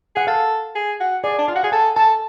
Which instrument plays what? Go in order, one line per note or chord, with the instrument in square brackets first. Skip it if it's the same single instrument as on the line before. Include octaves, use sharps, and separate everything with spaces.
[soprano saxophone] G#4 [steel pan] F#5
[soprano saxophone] A4 [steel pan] F5
[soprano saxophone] G#4
F#4
[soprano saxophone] G#4 [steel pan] D5
[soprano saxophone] D4
[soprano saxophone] F4 [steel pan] F5
[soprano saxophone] F#4
[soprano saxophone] G#4 [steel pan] F#5
[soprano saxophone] A4 [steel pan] G#5
[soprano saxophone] A4 [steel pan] A5